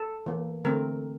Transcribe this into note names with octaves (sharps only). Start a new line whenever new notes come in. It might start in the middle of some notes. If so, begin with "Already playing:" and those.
Already playing: A4
E3 A#3
D3 A3 C4 A#4